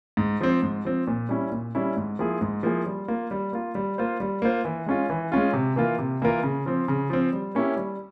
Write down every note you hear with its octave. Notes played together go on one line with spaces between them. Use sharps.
G#2
F3 C4
G#2
F3 C4
A#2
G3 C#4 E4
A#2
G3 C#4 E4
G#2
F3 A#3 E4 G#4
G#2
F3 A#3 E4 G#4
G3
A#3 F4
G3
A#3 F4
G3
A#3 F4 C5
G3
A#3 F4 C5
E3
G#3 C#4 F4
E3
G#3 C#4 F4
C3
E3 A#3 F4 A#4
C3
E3 A#3 F4 A#4
C#3
F3 C4
C#3
F3 C4
G3
A#3 C#4 E4 G4
G3